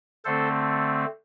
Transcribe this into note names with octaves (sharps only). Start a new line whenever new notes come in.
D3 A3 C4 A4 C5